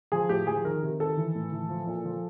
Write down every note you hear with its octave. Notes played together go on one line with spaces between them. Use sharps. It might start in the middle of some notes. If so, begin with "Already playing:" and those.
F3 G#4
A2 G4
F3 G#4
D#3 A#4
C3
D#3 A4
E3
A2
E3
F3
A#2
F3